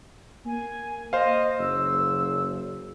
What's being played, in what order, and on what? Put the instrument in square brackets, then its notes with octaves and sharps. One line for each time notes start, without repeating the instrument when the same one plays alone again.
[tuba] A#3 [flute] G#5
[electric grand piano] C5 F5 [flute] D#5
[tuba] F#1 [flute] E6